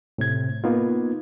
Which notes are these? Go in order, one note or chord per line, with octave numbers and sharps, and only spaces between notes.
A2 C3 G#6
A#3 B3 D#4 F4